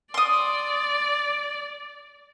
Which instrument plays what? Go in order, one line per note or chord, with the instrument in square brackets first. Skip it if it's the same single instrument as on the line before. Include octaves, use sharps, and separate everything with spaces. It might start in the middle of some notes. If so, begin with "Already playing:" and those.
[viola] D5 [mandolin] C6 D#6